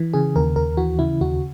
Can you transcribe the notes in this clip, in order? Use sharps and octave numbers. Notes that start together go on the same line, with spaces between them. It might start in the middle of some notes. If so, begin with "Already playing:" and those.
Already playing: E3
C#3 G#4
D#2 A#4
D#2 A#4
E3 F#4
C#3 E4
D#2 F#4